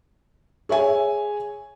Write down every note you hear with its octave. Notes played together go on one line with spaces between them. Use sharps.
G#4 C#5 E5 G#5